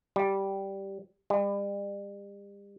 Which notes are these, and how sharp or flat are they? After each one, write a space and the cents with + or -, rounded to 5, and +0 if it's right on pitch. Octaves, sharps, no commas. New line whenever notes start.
G3 -5
G3 +40